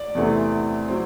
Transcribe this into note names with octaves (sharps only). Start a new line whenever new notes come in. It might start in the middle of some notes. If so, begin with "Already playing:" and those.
Already playing: D5
E2 C3 E3 A3 C4
F#3 C4